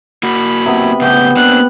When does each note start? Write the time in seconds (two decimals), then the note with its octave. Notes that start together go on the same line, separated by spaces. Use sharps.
0.23 A#3 F#4 B5
0.66 C3 B3
1.01 A2 C#3 B3 C4 G4 G6
1.36 A#3 C4 D4 F#6